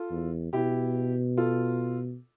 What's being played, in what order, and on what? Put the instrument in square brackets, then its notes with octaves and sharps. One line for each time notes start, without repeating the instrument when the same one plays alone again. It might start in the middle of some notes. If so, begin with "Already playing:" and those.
Already playing: [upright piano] F4 A4
[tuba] E2
[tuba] B2 [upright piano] E4 G4
[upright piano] F4 A4